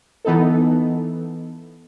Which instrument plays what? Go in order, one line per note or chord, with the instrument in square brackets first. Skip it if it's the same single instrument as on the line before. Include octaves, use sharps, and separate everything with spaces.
[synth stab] E3 B3 D#4 A4